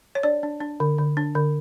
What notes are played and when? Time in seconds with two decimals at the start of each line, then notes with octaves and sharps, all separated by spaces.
0.15 C#5
0.23 D4 D5
0.43 D4
0.61 D4
0.80 D3
0.98 D3
1.17 D4
1.35 D3